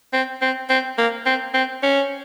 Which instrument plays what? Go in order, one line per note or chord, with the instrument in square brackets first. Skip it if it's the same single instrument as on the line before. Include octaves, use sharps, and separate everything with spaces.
[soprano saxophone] C4
C4
C4
A#3
C4
C4
C#4